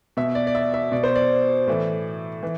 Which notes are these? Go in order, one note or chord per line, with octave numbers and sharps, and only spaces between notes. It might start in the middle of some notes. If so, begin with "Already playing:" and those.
B2 E5
D5
D5
E5
E5
B2 D5
C5
D5
A2 E3
E3